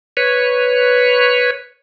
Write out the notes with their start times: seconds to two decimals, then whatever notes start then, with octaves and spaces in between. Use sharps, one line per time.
0.17 B4 C#5